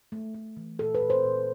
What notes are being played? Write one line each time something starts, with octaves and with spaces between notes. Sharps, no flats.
A3
A3
E3
A#2 A4
B4
A#2
C5
A#2